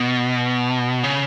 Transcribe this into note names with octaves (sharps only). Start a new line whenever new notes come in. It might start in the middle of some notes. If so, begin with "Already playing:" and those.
Already playing: B2
C#3